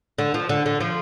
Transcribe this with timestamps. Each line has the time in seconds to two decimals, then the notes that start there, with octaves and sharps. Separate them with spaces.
0.18 D3
0.34 F3
0.49 D3
0.66 D3
0.80 F3